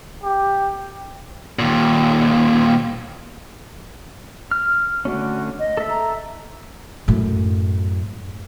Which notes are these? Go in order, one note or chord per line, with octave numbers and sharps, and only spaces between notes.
G4
D#2 A#2
F6
D3 A3 C#4 F#4
D#5
A4 E5
A#5
F#2 A2